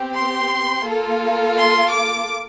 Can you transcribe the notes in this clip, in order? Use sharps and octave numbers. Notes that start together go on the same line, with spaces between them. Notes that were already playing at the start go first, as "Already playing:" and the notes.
Already playing: C4 G4
C6
A#3 F4 A4
C6
D6